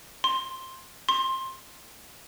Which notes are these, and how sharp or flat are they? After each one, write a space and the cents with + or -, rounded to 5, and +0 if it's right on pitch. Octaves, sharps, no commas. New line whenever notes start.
C6 +10
C6 +15